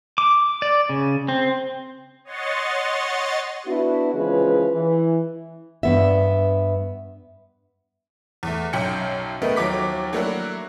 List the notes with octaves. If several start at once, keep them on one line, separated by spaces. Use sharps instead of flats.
D6
D5
C#3
C4
C#5 D#5 F#5 C6 C#6 A6
B3 D4 E4 F#4
C#3 E3 F3 G#3 B4 C#5
E3
G2 B3 E5
E2 A3
B1 F#2 G5 C#7
D#3 A3 B3 D#4 A#4 D7
D#2 F3 F#3 D6 B6
F#3 A3 A#3 D4 E4 F#4